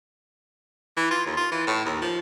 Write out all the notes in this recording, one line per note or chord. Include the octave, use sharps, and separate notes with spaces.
E3
F4
D#2
F4
E3
A2
D#2
F3